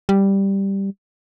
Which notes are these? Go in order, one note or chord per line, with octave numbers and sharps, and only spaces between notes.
G3